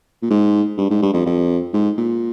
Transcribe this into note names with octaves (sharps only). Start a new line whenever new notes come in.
A#2
G#2
G2
G#2
G2
F2
F2
G#2
A#2